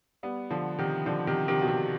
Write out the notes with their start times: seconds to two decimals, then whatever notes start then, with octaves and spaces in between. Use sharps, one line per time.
0.23 G3 B3
0.50 D3 F3
0.79 C3 D#3
1.06 D3 F3
1.27 C3 D#3
1.48 C3 D#3
1.61 B2
1.68 C3